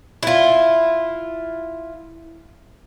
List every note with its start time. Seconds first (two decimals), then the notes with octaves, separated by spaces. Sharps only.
0.23 E4 F4